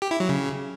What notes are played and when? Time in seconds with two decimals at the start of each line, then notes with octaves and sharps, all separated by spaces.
0.02 G4
0.11 E4
0.20 F#3
0.29 C#3